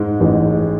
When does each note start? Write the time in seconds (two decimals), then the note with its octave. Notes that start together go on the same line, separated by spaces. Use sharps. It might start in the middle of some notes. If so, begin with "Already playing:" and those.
Already playing: G#2 G#3
0.20 A1